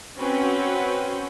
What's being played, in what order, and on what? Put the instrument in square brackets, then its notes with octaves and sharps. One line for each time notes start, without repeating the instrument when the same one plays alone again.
[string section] C4 C#4 F#4 B4 F#5 G5